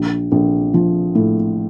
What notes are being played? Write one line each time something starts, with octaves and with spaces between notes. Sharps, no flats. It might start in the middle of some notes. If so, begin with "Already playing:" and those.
Already playing: A#1
A#1
F3
A2